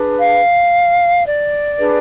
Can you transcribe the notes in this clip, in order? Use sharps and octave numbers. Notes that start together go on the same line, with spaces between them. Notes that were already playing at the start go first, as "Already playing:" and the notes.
Already playing: D4 G#4 B4
F5
D5
D4 G#4 B4